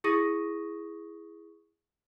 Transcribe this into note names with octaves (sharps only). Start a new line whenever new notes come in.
E4 G#4 C#6 D#6 A#6 D#7